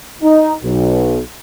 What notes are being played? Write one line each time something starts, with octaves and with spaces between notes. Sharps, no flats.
D#4
B1